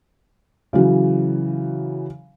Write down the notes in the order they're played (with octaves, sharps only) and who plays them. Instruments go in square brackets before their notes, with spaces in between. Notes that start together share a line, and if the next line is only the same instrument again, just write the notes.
[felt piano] C#3 E3 F#3